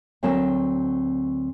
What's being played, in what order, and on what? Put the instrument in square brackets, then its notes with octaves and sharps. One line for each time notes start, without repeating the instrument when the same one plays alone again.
[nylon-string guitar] D2 F#3 C4 A#4 A5